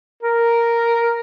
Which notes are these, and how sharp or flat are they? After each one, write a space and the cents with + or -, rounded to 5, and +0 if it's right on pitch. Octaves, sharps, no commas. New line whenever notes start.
A#4 +0